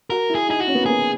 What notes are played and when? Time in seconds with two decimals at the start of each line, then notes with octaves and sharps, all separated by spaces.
0.10 F#4 A#4
0.30 E4
0.35 G#4
0.49 D#4 G#4
0.60 F#4
0.67 C#4
0.75 B3
0.82 A#3
0.86 B3 G#4